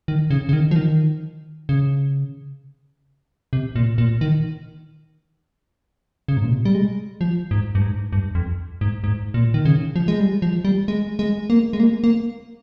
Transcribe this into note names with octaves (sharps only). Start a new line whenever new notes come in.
D#3
C#3
C#3
D#3
F3
D#3
C#3
C3
A#2
A#2
D#3
C#3
G#2
A#2
C3
G3
G#3
F3
G#2
G2
G#2
G2
F2
G#2
G#2
A#2
D#3
C#3
F3
G#3
G3
F3
G3
G#3
G#3
A#3
G#3
A#3
A#3